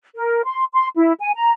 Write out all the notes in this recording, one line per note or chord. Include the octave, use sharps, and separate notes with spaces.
A#4
C6
C6
E4
G#5
A#5